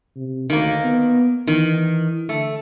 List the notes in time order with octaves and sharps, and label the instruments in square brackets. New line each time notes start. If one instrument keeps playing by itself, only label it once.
[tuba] C3
[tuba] D2 [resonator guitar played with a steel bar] D#3 A#3
[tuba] B3
[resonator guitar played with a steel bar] D#3 [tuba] E3
[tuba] D3 [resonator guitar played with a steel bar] A3